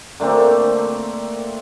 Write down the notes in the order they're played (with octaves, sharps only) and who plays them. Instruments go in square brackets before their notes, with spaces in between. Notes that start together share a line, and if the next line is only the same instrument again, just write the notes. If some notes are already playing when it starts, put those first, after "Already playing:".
[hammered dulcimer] D3 A3 A#3 C4